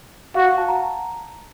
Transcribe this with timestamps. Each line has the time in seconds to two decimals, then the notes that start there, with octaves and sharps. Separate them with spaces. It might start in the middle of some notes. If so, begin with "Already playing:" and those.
0.35 F#4 F5
0.47 F#5
0.58 A5
0.68 A#5